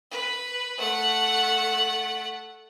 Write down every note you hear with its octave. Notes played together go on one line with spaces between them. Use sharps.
B4
A3 F#5